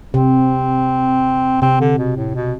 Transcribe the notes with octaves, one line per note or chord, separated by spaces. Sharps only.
C3 C4
C3 C4
D3
B2
A2
B2